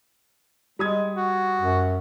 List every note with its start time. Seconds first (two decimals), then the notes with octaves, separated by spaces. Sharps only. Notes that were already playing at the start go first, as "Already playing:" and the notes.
0.79 G3 G#3 D#6 G#6
1.15 F#4
1.61 F#2